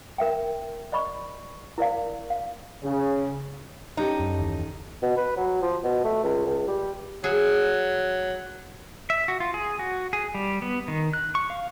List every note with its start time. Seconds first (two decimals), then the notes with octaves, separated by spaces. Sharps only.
0.18 A#4 E5 G5
0.92 D5 D#5 B5 C#6
1.78 E4 A#4 D5 F5
2.30 F5
2.83 C#3
3.97 C#4 D#4 G4 A4
4.20 F#2
4.37 F#1 D#2 E3
5.02 B2
5.17 B4
5.36 F#3
5.62 F3
5.84 B2
6.04 A3
6.23 C#2
6.46 C#2
6.67 G3
7.24 F#3 G#4
9.10 E5
9.28 F#4
9.40 F4
9.54 G#4
9.79 F#4
10.13 G#4
10.35 G3
10.62 B3
10.88 D#3
11.13 F#6
11.35 C#6
11.50 F5